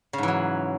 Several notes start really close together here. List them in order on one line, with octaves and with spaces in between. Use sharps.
C#3 G#2 E3 F#3